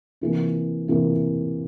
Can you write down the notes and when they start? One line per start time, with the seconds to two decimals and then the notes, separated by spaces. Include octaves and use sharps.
0.21 C3 E3 A#3
0.88 C3 E3 A#3